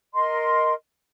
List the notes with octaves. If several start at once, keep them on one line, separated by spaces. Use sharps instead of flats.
A#4 D#5 C6